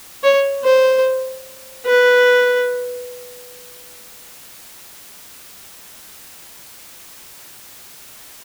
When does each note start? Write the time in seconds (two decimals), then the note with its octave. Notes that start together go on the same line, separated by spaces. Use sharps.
0.23 C#5
0.64 C5
1.86 B4